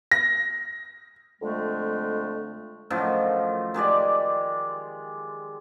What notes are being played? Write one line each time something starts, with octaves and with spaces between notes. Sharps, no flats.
A#6
F2 D3 G#3 A3
F#2 A2 D#3 F3
D#3 G#3 G4 D5